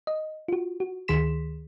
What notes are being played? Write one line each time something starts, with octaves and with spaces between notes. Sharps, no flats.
D#5
F4 F#4
F#4
D2 D#3 G#4 C6 B6 E7